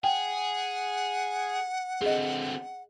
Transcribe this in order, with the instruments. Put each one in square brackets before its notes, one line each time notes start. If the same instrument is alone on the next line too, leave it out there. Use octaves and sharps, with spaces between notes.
[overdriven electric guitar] G#4 [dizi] F#5 [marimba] G5
[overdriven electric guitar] D3 C4 [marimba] G#4 D#5